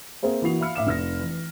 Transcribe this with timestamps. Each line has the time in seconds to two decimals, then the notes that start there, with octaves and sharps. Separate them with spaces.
0.23 A#3 C4 G#4 A#4 C5 E5
0.42 E3 A#3 E4 F#4 C7 F7
0.60 E5 F5 B5 F6 C#7
0.75 A2 E5 D6 E7
0.87 F1 F6 A#6
1.20 E3